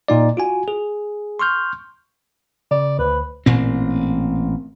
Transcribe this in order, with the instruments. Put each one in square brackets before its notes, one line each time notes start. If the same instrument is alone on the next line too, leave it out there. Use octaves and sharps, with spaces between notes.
[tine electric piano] A#2 D#4 D5
F4 F#4 G#5
G#4
C6 C#6 F6 G6
[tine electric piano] C#3 [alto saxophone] D5
[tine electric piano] D2 [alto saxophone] B4
[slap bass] A1 A#2 C4